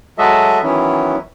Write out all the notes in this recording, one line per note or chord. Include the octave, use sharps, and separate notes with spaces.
F#3 G#3 F#4 A4 D#5 E5
D#3 E3 F#3 B3 C#4 E4